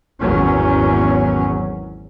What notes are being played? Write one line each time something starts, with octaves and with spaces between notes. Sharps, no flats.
G#1 E2 F#3 C#4